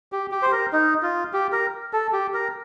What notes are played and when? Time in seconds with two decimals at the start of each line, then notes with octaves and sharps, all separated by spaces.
0.12 G4
0.32 G4
0.42 C5
0.52 A#4
0.73 D#4
1.03 F4
1.33 G4
1.52 A#4
1.93 A4
2.13 G4
2.34 A#4